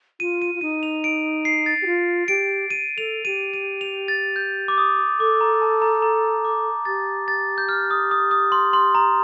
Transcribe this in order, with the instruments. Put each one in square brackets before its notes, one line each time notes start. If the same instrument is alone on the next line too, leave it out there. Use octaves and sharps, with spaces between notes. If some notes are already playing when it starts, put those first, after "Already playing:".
[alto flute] F4 [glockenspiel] D#7
[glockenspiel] D#7
[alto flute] F4
[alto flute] D#4 [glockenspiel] D#7
[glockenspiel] F7
D7
C7
A6
[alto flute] G4
F4
[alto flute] G4 [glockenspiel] D7
[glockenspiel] D#7
[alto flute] A4 [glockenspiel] F7
[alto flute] G4 [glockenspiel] D#7
[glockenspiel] D#7
F7
A6
G6
D6
D#6
[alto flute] A4 [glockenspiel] D6
[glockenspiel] A#5
A5
A#5
A#5
D6
[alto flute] G4 [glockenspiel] A6
[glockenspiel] A6
G6
F6
D#6
D#6
D#6
C6
C6
A#5